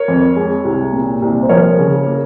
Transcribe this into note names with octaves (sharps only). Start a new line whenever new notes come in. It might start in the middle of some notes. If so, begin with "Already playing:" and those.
Already playing: A#4 C#5
F2
G#3
C2
A#2
C2
C5
F3 A#4 C#5
C#3
A#3